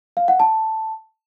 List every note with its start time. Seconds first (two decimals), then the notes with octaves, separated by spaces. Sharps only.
0.17 F5
0.28 F#5
0.40 A5